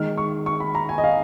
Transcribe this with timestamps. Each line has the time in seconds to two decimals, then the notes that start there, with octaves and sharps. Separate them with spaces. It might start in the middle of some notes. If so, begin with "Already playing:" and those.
Already playing: D#3 G#3 D#4 F6
0.18 C#6
0.46 C#6
0.60 B5
0.75 A#5
0.89 G#5
0.98 D#5
1.04 F5